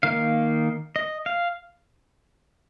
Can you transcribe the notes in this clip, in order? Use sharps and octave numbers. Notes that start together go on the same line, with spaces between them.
D#3 A#3 D#4 F5
D#5
F5